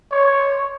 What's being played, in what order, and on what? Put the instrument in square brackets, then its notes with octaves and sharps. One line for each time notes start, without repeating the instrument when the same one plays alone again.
[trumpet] C#5